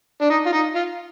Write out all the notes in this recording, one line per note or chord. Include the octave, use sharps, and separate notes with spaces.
D4
D#4
F4
D#4
F4